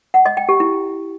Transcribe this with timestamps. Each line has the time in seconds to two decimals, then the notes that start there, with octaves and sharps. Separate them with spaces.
0.14 F#5
0.26 D#5
0.37 G5
0.49 G4
0.60 E4